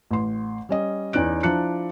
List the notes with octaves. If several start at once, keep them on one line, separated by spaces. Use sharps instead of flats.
A1 C6
G3 C#4 D#5
E2 C#4 D#4 D5 F#6 D7
F3 D4 E4 A#5 F#6 C#7